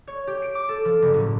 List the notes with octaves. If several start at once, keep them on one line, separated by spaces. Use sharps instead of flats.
C#5
G4
D7
D6
A4
F3
F#1
A2